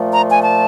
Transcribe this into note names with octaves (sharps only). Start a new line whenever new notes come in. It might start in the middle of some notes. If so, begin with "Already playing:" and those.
Already playing: A#2 F3 A3
A#5
G#5
A5